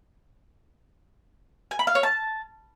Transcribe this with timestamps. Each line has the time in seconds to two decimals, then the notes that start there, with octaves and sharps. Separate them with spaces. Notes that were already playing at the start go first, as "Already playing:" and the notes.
1.71 G#5
1.79 B5
1.87 F5
1.95 C#5
2.03 A5